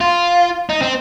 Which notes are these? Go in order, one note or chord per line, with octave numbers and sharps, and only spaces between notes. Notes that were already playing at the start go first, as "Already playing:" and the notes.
F4
D#4
C4